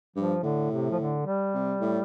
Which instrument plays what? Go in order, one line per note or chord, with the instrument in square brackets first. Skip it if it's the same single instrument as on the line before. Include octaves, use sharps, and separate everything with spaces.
[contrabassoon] G2 [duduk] F3
[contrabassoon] A2 [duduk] D3
[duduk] C3
F3
D3
G3
[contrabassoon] C3
A2